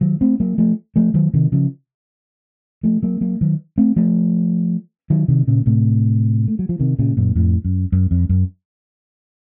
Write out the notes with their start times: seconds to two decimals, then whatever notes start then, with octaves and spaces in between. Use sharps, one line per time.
0.01 D#3 F#3
0.21 A3 C4
0.40 F#3 A#3
0.58 F3 A3
0.96 F3 A3
1.14 D#3 F#3
1.34 C3 D#3
1.52 C#3 F3
2.83 F3 A3
3.03 F#3 A#3
3.21 F#3 A#3
3.41 D#3 F#3
3.78 A3 C4
3.96 F3 A3
5.10 D#3 F#3
5.28 C3 D#3
5.48 A#2 C#3
5.66 A2 C3
6.48 A3
6.59 F#3
6.69 F3
6.80 C3 D#3
6.99 A#2 C#3
7.17 F#2 A#2
7.35 F2 A2
7.65 F#2
7.92 F#2
8.11 F2
8.29 F#2